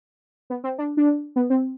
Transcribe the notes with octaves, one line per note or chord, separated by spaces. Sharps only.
B3
C4
D4
D4
B3
C4